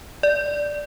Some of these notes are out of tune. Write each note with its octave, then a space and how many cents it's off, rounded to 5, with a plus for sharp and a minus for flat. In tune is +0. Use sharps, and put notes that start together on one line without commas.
D5 -5